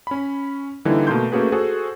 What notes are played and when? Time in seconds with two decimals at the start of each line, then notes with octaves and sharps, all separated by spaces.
0.07 C#4 B5
0.85 D3 E3 G3 A#3 D#4 E4
1.07 B2 A3 A#3 C6 G6
1.32 A3 A#3 C#4 F#4 G#4 B4
1.52 F#4 G#4 A4 C5